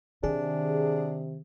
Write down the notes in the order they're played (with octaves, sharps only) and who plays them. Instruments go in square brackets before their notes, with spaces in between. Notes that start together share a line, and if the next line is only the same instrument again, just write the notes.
[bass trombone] C3 [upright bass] D#3 [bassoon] D4 [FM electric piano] G#4